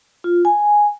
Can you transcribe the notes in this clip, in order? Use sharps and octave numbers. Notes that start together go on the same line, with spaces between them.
F4
G#5